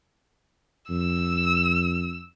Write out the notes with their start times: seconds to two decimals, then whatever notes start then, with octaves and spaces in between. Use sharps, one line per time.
0.91 F2 E6